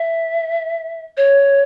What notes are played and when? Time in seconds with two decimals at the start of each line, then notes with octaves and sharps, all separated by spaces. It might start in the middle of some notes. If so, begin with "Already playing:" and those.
Already playing: E5
1.17 C#5